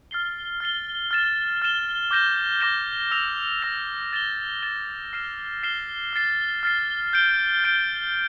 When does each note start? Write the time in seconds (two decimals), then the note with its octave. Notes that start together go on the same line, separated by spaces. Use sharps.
0.11 F6 A6 C7 G7
0.60 F6 A6 C7 G7
1.11 F6 A6 E7 G7
1.62 F6 A6 E7 G7
2.11 D6 G6 A#6 E7 G7
2.61 D6 G6 A#6 E7 G7
3.11 E6 A#6 F7
3.62 E6 A#6 F7
4.13 A6 E7 G7
4.63 A6 E7 G7
5.13 F6 C7 E7 G7
5.63 F6 C7 E7 G7
6.13 F6 A6 C7
6.63 F6 A6 C7
7.13 G6 D7 G7
7.64 G6 D7 G7